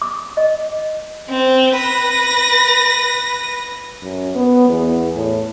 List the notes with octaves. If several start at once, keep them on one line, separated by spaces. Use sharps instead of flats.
D6
D#5
C4
B4 A#6
F#2
B3
E2
A2